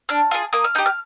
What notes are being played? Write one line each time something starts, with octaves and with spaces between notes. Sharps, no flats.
D4 F6
F4 G#4
A#3 D#6
F6
D#4 G4 G6
F6